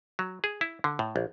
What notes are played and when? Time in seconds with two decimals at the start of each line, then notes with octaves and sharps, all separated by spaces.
0.19 F#3
0.44 G#4
0.61 E4
0.84 D3
0.99 A2
1.16 A#1